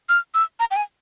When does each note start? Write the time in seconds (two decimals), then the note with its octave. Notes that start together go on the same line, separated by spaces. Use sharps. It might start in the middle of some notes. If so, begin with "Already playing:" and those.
0.09 F6
0.35 E6
0.60 A#5
0.71 G5
0.76 G#5